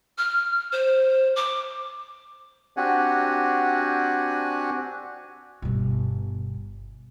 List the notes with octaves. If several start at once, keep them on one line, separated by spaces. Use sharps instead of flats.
F6
C5
D6
C4 D4 F#4 G4 F#5 G#5
G1 B2